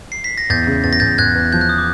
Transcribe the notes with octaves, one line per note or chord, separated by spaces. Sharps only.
C7
B6
A#6
E2 G6 A6
C#3
E2 A6
A#6
E2 G6 A6
E2 F#6 G#6
E2
F3 G6
F#6
D#6
D6